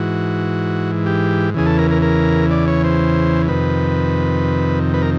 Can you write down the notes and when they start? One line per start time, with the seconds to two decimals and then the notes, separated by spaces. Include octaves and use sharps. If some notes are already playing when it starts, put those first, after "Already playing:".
Already playing: G#2 E3 F#4
1.06 G4
1.54 E2 C#3 E3 G#4
1.66 A4
1.79 A#4
1.91 A#4
2.02 A#4
2.51 D5
2.68 C#5
2.84 C5
3.48 F2 C3 D#3 B4
4.94 B4
5.02 A#4